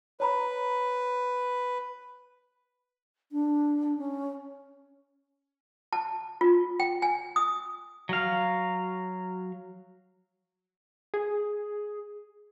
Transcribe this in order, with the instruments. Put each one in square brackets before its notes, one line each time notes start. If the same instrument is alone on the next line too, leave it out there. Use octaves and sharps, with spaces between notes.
[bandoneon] B4 [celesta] C#5 A#5 B5
[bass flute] D4
C#4
[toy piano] A5
F4
G5
G#5
D#6
[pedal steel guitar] F#3 F5
[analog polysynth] G#4